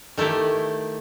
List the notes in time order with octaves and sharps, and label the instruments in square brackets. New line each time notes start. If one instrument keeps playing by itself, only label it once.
[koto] D#3 A3 E4 G4